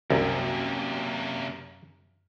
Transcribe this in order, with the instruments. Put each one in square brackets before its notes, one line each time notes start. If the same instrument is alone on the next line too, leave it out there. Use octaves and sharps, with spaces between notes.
[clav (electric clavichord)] C2 [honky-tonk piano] F#2 [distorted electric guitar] C3 A#3